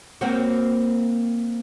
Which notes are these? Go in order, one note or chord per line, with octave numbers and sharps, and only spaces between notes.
A#3 C4 F#4